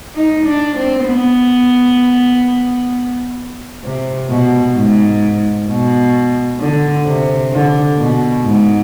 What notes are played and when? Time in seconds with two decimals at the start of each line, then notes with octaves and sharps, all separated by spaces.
0.15 D#4
0.46 D4
0.76 C4
1.07 B3
3.83 C3
4.29 B2
4.76 G#2
5.68 B2
6.59 D3
7.06 C3
7.52 D3
7.98 B2
8.44 G#2